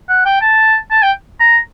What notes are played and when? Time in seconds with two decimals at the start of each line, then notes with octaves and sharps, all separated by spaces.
0.09 F#5
0.25 G5
0.42 A5
0.91 A5
1.03 G5
1.40 A#5